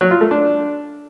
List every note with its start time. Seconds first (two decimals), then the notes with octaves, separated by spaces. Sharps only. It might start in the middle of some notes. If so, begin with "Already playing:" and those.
0.01 F#3
0.11 F4
0.21 A3
0.31 D4